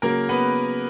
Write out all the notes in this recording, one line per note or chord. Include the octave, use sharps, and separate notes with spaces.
C#3 F#3 A#3 A#4
B3 B4